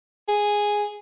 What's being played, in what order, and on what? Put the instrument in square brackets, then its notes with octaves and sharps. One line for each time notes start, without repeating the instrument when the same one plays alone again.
[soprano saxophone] G#4